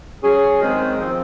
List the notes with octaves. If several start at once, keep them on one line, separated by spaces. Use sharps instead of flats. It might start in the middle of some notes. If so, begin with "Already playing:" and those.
F#3 C#4 G#4
D#3 G#3 C4
F3 C4 F4